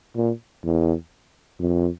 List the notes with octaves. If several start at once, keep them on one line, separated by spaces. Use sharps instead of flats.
A#2
E2
F2